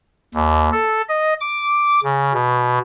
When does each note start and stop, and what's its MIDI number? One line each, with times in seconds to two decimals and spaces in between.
0.34 0.69 39
0.72 1.02 69
1.08 1.33 75
1.41 2.00 86
2.04 2.33 49
2.33 2.79 47